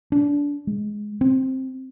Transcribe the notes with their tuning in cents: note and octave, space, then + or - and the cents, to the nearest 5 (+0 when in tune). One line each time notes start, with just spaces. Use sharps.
D4 -25
G#3 +10
C4 +10